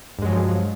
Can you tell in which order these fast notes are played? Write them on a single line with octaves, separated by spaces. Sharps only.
G2 G#3 F#3 F3